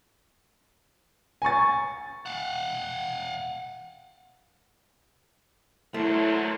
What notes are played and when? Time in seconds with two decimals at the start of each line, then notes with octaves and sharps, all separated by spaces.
1.42 G#5 A#5 C#6 A6
2.26 F5 F#5
5.94 E2 D3 F#3 A3 E4 A#4 C5 A5